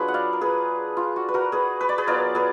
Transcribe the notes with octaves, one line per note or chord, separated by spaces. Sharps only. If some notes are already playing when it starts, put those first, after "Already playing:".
Already playing: F#3 D4 F4 G#4 B4
F#5
D5 F5
A#4
G#4 B4
F4
F#4
B4
F#4 A#4
G#4 B4
B4
D5
G#4 B4
F#3 B3 F4 A#4 D5
G#4 B4